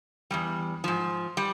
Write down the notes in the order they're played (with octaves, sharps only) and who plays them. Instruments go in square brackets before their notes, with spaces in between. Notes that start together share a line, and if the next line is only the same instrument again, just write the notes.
[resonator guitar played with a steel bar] E2 C3 G3
G#2 F3
G3